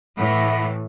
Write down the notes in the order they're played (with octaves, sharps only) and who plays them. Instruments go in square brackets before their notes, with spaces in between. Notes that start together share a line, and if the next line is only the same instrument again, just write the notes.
[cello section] A2 E3 [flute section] E5 F#5 B5